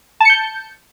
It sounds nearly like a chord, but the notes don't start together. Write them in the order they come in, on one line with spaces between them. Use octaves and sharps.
A5 C#7 G6